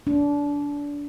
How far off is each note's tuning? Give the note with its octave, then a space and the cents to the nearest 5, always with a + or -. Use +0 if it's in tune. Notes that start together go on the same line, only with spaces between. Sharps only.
D4 -25